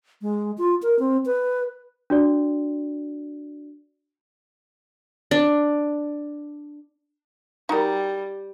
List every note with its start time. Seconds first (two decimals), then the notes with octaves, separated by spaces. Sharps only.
0.22 G#3
0.58 F4
0.82 A#4
0.99 C4
1.25 B4
2.10 D4 F#4 D5
5.31 D4
7.69 G3 D#4 F#4 A#4